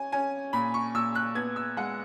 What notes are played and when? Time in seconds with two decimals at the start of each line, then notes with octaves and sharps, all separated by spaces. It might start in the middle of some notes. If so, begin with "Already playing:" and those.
Already playing: C#4 G#5
0.12 C#4 G#5
0.53 A#2 B5
0.74 C#6
0.95 A#2 E6
1.15 F#6
1.35 B3 G#6
1.56 E6
1.77 G#3 F#5